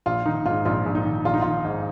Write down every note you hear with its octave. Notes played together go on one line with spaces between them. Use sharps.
A#1 F4
D#3 D#4
G#2 F4
A#1 F4
A#1
D#4
D#3
A#1 F4
D#4
D#3 F4
G#2